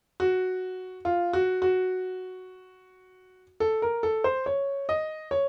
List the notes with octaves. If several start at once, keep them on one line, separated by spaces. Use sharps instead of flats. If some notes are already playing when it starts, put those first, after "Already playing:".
F#4
F4
F#4
F#4
A4
A#4
A4
C5
C#5
D#5
C#5